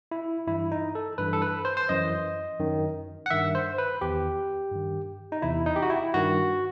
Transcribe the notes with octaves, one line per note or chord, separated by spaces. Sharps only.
E4
G2 E3 E4
D#4
A4
G2 E3 B4
A4
B4
C5
C5
F#2 E3 D#5
F#2 D#3
F#5
G2 D#3 E5
C5
B4
E2 D#3 G4
G2 D#3
D#4
E2 C3 E3 E4
D#4
G4
F#4
E4
G2 D#3 F#4